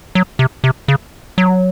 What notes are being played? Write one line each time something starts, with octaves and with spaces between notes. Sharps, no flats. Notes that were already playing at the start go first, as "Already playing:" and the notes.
F#3
C3
C3
C#3
F#3